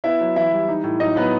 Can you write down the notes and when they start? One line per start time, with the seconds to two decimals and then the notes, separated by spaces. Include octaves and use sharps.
0.04 B3 E4 E5
0.21 F#3
0.36 E3 E4 E5
0.52 G3
0.68 D#4
0.84 A2
1.00 F#3 D#4 D#5
1.16 F#3 B3 B4